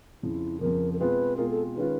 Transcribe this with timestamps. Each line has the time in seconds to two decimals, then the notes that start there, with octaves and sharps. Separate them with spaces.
0.23 F2 C#3 F3 E4
0.61 F2 C#3 F3 A#4
0.94 A#4
0.99 B2 G#3 C4 F4 G#4 B4
1.37 B2 G#3 C4 F4 G#4 A#4
1.50 A4
1.76 D#3 G#3 C#4 F4 B4